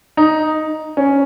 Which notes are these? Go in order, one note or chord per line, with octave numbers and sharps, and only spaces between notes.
D#4
C#4